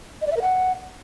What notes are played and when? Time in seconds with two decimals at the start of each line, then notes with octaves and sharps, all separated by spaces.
0.21 D#5
0.26 D5
0.31 E5
0.37 A#4
0.42 F#5